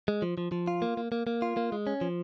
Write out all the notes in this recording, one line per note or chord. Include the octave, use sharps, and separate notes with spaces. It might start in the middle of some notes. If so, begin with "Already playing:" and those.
G#3
F3
F3
F3
F4
A#3
A#3
A#3
A#3
F4
A#3
G#3
C#4
F3